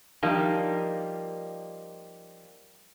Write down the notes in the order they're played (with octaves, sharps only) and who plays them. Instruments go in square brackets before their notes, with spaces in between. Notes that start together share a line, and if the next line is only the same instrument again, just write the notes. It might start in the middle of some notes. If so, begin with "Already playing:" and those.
[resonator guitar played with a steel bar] F3 G3 A#3 D#4